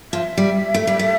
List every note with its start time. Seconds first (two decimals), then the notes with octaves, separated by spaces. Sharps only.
0.13 F3 E5
0.37 G3
0.74 A3
0.87 G3
0.99 A3